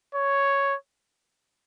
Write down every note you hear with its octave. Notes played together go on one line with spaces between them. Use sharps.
C#5